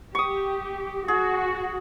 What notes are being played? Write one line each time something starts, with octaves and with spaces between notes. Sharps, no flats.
G4 C#6 D#6
F#4 G#4